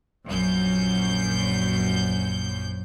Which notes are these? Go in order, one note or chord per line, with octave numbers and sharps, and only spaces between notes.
A#1 F#2 G6